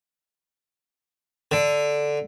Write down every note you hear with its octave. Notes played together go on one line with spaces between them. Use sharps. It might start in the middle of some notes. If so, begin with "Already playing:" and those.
D3